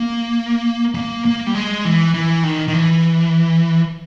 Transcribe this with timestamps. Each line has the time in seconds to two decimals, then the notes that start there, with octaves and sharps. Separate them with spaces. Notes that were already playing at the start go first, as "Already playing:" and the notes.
Already playing: A#3
0.95 A#3
1.25 A#3
1.47 G3
1.55 G#3
1.85 E3
2.14 E3
2.43 D#3
2.68 D#3
2.73 E3